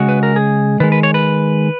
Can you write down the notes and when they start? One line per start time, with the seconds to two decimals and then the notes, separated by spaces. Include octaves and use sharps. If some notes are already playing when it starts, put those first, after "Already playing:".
Already playing: C#3 G#3 F#4
0.09 B4
0.23 A#4
0.36 G#4
0.80 D#3 B4
0.83 G#3
0.92 B4
1.03 C#5
1.14 B4